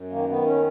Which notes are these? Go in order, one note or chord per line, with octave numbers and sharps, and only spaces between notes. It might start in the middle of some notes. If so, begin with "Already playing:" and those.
Already playing: F#2
D#3 A#3
D#3 B3
C#4